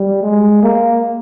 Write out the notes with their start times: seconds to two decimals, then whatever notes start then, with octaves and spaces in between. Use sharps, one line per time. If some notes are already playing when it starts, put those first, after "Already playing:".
Already playing: G3
0.23 G#3
0.63 A#3